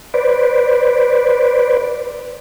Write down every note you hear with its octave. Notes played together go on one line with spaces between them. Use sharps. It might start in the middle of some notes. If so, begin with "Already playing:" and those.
B4 C5 D5